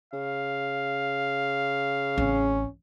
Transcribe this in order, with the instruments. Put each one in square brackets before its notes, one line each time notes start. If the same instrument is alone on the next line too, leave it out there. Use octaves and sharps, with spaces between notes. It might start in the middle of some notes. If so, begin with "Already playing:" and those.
[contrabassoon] C#3 [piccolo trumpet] F5
[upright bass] A1 C4 [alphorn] C#4